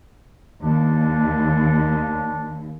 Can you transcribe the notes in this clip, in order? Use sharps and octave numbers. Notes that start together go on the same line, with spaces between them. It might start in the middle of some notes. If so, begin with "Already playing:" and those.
D#2 D4